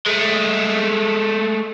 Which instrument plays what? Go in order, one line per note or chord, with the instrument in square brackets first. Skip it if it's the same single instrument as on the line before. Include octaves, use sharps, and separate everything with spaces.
[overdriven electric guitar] G#3 A3